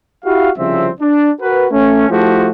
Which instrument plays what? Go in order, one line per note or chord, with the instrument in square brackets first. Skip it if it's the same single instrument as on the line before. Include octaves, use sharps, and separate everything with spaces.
[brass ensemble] E4 F#4 G4 F5
C2 C#3 F3 C4 E5
D4
F#4 A#4 B4
A3 C#4
F3 A3 E4 F#4 G4